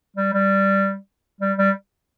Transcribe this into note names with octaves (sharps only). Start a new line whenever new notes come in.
G3
G3
G3
G3